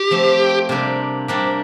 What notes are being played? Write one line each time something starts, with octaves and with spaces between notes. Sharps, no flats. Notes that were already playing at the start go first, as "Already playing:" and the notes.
Already playing: G4
F3 A3 C4
C3 G3 A#3 D4 G4
C3 G3 A#3 D4 G4